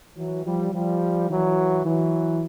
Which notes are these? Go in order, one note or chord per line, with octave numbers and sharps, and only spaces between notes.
E3 F#3
F3 G3
F3 G3
E3 F#3
E3 F#3